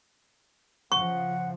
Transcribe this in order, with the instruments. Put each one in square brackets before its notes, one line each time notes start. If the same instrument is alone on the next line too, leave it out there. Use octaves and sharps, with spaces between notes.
[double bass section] C#3 F3 [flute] F#5 [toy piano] C#6